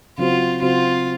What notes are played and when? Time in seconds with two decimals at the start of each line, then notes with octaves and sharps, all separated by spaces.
0.18 C#3 F#3 C4 F4 F#4 C5
0.62 C#3 F#3 C4 F4 F#4 C5